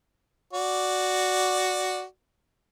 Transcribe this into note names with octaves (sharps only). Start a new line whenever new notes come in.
F#4 D5